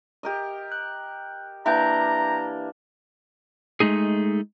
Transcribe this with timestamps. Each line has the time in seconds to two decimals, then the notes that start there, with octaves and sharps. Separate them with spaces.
0.23 G4 A#4 D#5
0.72 F#6
1.66 E3 A#3 D4 E5 G5 A#5 G6
3.80 G#3 A3 D#4 G#4